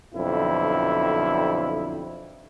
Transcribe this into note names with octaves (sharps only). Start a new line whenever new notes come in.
B1 F2 D3 E4